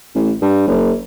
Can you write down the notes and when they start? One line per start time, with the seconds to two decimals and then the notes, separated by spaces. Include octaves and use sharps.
0.15 A1
0.42 G2
0.67 F#1